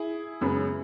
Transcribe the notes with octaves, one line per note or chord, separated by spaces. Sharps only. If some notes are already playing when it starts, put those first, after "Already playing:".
Already playing: E4 G#4
F#2 C#3 G#3 B3